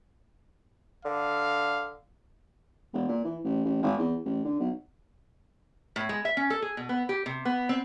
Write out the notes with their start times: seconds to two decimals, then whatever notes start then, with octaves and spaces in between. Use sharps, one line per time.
1.05 D3 F5
2.93 E1
3.08 A#2
3.24 E3
3.44 A1
3.65 A1
3.82 G#1
3.98 E2
4.25 A1
4.44 D3
4.60 B1
5.96 A2
6.09 G#3
6.25 E5
6.37 C#4
6.50 A4
6.62 G#4
6.77 B2
6.89 B3
7.09 G4
7.26 C3
7.45 B3
7.69 C4